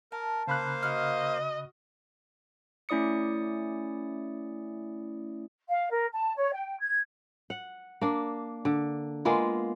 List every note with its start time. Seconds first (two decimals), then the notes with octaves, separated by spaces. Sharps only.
0.12 A#4 A5
0.47 C#3 A#3 C5 F5 B5 F#6
0.83 F#4 D#5 F6
2.89 A3 C#4 E4 D5 D#6 C#7
5.70 F5
5.91 A#4
6.11 A5
6.36 C#5
6.53 G5
6.79 G#6
7.50 F#5
8.01 A#3 D4
8.65 D3
9.25 G#3 A#3 B3 F4